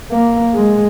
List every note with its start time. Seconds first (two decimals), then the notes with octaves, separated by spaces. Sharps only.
0.12 A#3
0.55 G#3